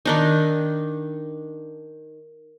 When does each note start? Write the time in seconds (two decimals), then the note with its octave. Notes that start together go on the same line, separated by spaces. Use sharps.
0.05 D#3 D4 D#4